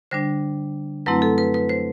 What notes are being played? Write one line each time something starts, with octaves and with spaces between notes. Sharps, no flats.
D3 G3 D4 C5
F#2 F#3 A3 C4 E4 B4
A4
B4
B4
C5